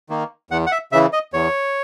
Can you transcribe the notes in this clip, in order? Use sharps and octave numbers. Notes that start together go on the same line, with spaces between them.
D#3 A#3
E2 F#5
F#5
E5
C#3 E3 E5
D#5
E2 C#5